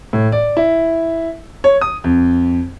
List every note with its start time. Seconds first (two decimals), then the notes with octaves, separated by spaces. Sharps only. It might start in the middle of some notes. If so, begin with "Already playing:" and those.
0.13 A2
0.32 D5
0.57 E4
1.64 C#5
1.81 D#6
2.04 F2